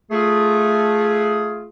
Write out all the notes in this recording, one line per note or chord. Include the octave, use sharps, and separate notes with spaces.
A3 F4 G#4